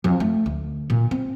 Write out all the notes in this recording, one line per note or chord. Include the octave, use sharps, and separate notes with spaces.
F2
A3
D2
A#2
C4